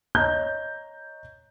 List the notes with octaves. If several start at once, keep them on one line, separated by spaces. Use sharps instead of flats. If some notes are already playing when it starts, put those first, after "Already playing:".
C#5 D#5 A#5 G6